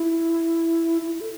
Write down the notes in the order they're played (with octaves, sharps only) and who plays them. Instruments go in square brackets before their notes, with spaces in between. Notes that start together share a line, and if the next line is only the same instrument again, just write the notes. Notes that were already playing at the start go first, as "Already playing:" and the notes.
Already playing: [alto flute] E4
E4
A4